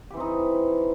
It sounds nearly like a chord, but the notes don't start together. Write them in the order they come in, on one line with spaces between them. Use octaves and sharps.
G4 E3 C4 D#4